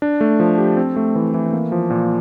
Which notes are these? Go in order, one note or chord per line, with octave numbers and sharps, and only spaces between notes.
D4
A3
F3
G4
C4
A3
E3
E3
A#3
F3
A#2